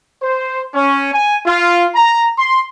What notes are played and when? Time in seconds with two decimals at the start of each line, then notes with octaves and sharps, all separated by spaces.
0.23 C5
0.75 C#4
1.13 G#5
1.46 F4
1.95 A#5
2.39 C6